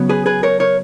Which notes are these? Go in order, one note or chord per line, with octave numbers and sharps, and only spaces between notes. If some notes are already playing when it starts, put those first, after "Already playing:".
Already playing: C#3 F#3 B3
G#4 B4
G#4 B4
A#4 C#5
A#4 C#5